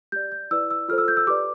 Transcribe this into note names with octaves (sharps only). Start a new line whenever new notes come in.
G4 D5 G6
G6
E4 B4 D5 E6
E6
F4 A4 C5 F6
E6
G6
E6
G4 B4 D5 D6